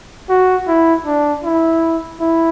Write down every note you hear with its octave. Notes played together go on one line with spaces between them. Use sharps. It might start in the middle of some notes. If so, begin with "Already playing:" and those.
F#4
E4
D4
E4
E4